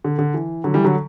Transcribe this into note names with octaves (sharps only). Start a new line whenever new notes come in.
D3
D3
E3
D3 F#3
E3 G3
D3 F#3